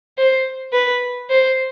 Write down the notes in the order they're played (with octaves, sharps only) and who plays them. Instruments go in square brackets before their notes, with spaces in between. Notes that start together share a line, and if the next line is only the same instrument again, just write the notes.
[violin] C5
B4
C5